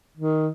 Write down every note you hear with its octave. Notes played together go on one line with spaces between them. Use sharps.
D#3